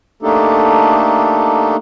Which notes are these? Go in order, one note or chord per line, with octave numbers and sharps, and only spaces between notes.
A3 A#3 D4 D#4 G4 A4